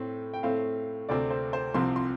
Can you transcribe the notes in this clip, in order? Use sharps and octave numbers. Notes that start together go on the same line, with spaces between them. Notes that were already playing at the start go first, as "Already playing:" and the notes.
Already playing: A2 A3 C4
G5
A2 A3 C4 F5
D2 C3 A3 C4 D5
C5
C5
C2 C3 F3 C4 C6
C6